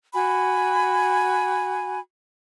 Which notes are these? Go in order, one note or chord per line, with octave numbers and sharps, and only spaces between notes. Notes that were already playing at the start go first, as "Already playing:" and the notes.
F#4 G#5 B5